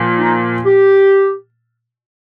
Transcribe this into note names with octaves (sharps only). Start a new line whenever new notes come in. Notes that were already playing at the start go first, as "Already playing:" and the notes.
Already playing: A#2 F3
D#4
G4